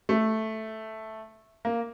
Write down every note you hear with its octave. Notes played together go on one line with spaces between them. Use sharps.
A3
A#3